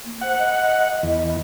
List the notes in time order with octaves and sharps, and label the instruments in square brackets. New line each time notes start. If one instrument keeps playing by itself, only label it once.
[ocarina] A#3
[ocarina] C5 [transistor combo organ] F#5
[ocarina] D#5
[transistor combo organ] E2